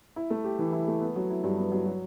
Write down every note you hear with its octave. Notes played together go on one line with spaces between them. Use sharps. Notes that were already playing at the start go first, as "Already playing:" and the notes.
E4
A3
G4
E3
E4
A3
B3
F#3
E4
G2
B3
F#3
F#3